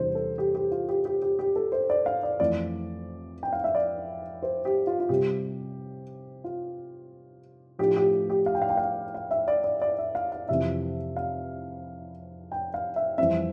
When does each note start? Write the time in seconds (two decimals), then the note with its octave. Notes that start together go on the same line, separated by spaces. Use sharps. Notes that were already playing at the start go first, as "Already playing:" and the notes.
Already playing: E2 C3 G3 D4 C5
0.15 A4
0.38 G4
0.55 G4
0.71 F4
0.89 G4
1.05 G4
1.22 G4
1.39 G4
1.56 A4
1.72 C5
1.90 D5
2.06 F5
2.23 D5
2.40 F2 E3 A3 D5
3.43 G5
3.53 F5
3.64 E5
3.75 D5
4.43 C5
4.65 G4
4.87 F4
5.00 F4
5.09 C3 G3 C4 G4
6.44 F4
7.79 A2 F3 A3 D4 G4
7.96 G4
8.30 G4
8.46 F5
8.55 G5
8.62 F5
8.70 G5
8.77 F5
9.15 F5
9.31 E5
9.48 D5
9.64 D5
9.81 D5
9.98 E5
10.15 F5
10.32 F5
10.49 F2 C3 E3 E5
11.16 F5
12.52 G5
12.74 F5
12.96 E5
13.18 F2 E3 G3 C4 E5